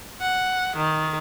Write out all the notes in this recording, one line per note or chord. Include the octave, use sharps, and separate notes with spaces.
F#5
D#3